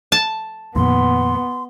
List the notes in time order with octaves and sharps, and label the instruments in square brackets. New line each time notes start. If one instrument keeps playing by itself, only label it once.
[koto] A5
[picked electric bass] F2 A#2 D#3 [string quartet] B3 [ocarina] C6